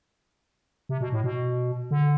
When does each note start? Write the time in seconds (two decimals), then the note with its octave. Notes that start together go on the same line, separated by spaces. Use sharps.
0.89 C3
1.01 B2
1.12 A2
1.24 B2
1.91 D3